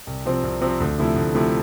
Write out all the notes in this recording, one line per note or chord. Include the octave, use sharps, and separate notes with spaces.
C2
C3 F3 C4
C2
C3 F3 C4
D2
C3 F3 A3 E4
D2
C3 F3 A3 E4